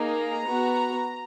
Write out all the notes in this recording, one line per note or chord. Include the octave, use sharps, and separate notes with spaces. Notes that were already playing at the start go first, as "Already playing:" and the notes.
Already playing: A#3 D#4 G#4 A#5
B3 F#4